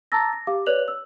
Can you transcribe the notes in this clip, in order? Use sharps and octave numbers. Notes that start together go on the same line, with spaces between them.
A5 A#5 D6 E6 A6 A#6
A#6
G4 F5 D6
B4 C#5 D5 F#6 F7 F#7
E6